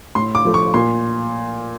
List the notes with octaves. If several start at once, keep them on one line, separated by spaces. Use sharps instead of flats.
A2 C6
D6
F3 A3
C#6
A#2 C6